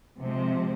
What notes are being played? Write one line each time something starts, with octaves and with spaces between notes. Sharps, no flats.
C3 F3 G#3 C4